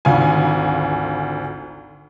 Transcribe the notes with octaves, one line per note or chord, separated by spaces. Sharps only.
G#1 D2 F4 G#5